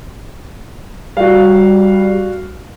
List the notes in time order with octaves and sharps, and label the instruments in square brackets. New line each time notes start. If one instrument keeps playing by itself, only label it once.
[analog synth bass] G3 [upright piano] F#4 F5